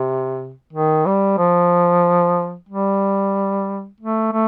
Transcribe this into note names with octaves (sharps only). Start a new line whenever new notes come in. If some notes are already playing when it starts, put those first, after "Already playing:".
Already playing: C3
D#3
G3
F3
G3
A3
A3